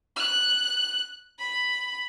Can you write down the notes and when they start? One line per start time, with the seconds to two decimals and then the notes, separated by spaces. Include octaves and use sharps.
0.16 F#6
1.38 B5